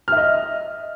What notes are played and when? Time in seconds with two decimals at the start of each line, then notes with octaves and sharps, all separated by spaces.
0.08 F6
0.12 E5
0.17 D#5